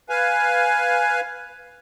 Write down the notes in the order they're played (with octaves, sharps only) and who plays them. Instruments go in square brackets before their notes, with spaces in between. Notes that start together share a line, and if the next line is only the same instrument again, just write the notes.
[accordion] B4 F5 G#5